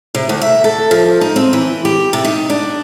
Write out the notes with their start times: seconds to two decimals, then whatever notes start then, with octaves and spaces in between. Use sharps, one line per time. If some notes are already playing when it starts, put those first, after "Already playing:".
0.15 C3
0.29 D2
0.41 E5
0.64 A4
0.91 F3
1.21 D#4
1.36 C4
1.53 E3
1.85 G4
2.13 C3
2.24 D#4
2.50 D4